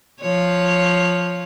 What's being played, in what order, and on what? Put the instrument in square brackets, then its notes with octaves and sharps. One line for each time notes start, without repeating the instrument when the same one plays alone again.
[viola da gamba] F3 C#5